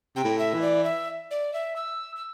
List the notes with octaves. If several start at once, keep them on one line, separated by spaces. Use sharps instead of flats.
C3 G5
A2
E5
E3
D5
E5
D5
E5
E6
E6